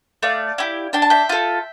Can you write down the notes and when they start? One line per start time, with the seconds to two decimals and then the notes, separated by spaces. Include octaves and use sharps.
0.23 A3 D5 F5
0.58 E4 G4
0.93 D4 G5
1.02 A5
1.10 E5 G5
1.29 F4 A4